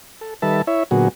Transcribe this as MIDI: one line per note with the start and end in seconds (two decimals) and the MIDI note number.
0.21 0.34 69
0.42 0.62 51
0.42 0.62 55
0.42 0.62 69
0.42 0.62 71
0.42 0.62 76
0.42 0.62 81
0.67 0.83 64
0.67 0.83 73
0.67 0.83 76
0.91 1.08 46
0.91 1.08 50
0.91 1.08 54
0.91 1.08 59
0.91 1.08 66
0.91 1.08 68